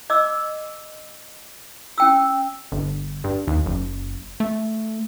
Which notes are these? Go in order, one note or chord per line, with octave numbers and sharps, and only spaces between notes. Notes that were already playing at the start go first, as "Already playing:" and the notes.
D#5 D6 E6
C#4 G5 E6
G1
G2
D#2
F#1
A3